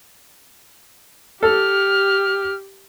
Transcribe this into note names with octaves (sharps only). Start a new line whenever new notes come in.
G4 A4 F6